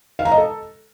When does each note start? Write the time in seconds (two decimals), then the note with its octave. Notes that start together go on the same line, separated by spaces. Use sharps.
0.19 F5
0.25 A#5
0.31 D#5
0.38 A4